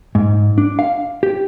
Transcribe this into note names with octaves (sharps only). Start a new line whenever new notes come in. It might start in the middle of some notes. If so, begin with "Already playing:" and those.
G#2
D4
F5
G4